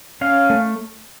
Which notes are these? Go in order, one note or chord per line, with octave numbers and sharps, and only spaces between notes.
C#4 F5
A3